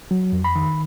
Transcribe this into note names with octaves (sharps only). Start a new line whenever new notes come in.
F#3
F2
B5
D#3